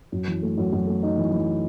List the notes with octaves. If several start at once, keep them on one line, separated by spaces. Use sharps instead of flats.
F#2
E3
A3
F#2
F#2
A3
D#4
E3
E3